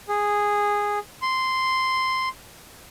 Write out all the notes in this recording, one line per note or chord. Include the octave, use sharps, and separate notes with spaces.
G#4
C6